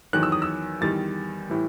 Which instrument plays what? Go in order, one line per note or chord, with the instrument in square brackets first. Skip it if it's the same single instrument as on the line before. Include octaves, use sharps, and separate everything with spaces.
[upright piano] E2 D#3 F#3 F#6
E6
D#6
E6
E2 D#3 G3 A6
A2 E3 G3